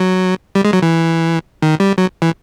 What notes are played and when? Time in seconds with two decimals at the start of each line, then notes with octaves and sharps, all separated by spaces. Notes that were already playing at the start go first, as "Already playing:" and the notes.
Already playing: F#3
0.55 G3
0.65 G#3
0.73 F#3
0.82 E3
1.62 D#3
1.80 G3
1.98 F#3
2.22 E3